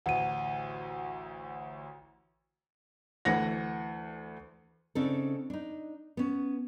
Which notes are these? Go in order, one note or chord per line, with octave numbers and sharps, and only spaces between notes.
A1 D2 F#5 D#7
D2 E3 F#5 A#6
C#3 C4 D4 D#4 A4
D4 D#4
B3 C#4